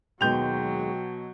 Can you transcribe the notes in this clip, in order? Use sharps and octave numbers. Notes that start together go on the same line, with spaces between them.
D#2 B2 F#3 G#3 G5 G6 F7